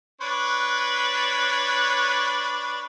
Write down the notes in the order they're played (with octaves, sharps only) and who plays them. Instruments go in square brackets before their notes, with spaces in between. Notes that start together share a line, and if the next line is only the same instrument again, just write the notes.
[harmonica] D4 B4 C#5